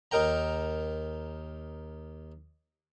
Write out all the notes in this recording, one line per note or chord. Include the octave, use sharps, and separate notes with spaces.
D#2 D#4 A#4 G5 A#5